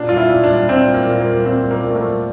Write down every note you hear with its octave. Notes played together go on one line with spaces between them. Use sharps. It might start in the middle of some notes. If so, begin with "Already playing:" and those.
Already playing: A#2 D4
G3 F4
E4
A#2
D4
G3
A#2 C4
G3
A#3
A#2
A#3
G3
A#2 C4
G3
A#3
A#2
A3
A#3
G3